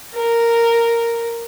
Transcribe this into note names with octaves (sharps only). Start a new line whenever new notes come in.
A#4